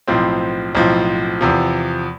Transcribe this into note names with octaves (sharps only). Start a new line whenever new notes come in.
B1 A2 F3 C4
B1 A2 F3 C4
E2 C3 F3